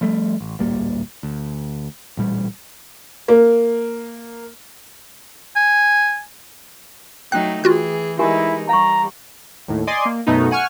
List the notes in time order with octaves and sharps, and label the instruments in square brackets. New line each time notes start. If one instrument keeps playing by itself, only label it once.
[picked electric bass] F3 G3 A3
A1
D1 A#1 G3 A#3
D2
A1 A#2 G3
[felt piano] A#3
[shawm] G#5
[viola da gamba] F#3 A3 D#4 [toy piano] G5 [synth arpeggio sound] F#6
[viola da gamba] E3 G#4 [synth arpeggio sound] F4 F#4 F#6
[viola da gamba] E3 G#3 D#4 [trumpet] E4 [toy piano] G4 A#4 G#5
[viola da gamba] G3 [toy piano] F5 C#6 [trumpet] A#5
[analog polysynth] D#2 A2
D5 D#5 G#5 C6 D6
A#3
F#2 B2 A3 B3 D#4
F#5 G#5 C#6 F6